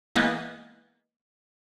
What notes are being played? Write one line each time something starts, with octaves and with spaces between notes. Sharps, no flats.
E3 G#3 A#3 B3